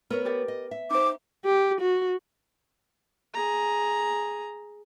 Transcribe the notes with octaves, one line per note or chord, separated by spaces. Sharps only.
B3 A#4 B4 C#5
G4 A#4 D5
D#5
E5
D#4 C5 D6
G4
F#4
G#4 A#5